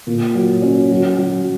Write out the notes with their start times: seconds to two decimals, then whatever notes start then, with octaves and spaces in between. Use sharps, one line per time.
0.07 A#2
0.35 F#3
0.62 C#4
0.91 F#3
1.19 F#3